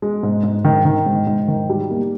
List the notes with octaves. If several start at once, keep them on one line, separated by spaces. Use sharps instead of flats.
G#3
G#2
G#2
D#3
D#3
G#2
G#2
D#3
G3
A#3